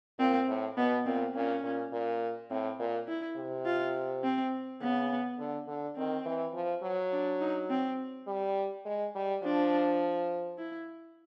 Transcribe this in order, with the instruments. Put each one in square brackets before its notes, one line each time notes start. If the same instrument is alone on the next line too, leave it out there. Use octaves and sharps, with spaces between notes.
[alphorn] A#2 [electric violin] C4
[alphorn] A2
[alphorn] B2 [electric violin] B3
[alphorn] A#2 [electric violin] C4
[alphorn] A#2 [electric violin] C#4
[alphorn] A#2
A#2
[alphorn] A2 [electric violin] C4
[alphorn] A#2
[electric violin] E4
[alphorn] C3
[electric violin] F4
C4
[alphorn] C#3 [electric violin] B3
[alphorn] D3
D3
[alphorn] D#3 [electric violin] C4
[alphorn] E3
F3
F#3
[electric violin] D4
D#4
C4
[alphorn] G3
G#3
G3
[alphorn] F3 [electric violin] D4
[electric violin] E4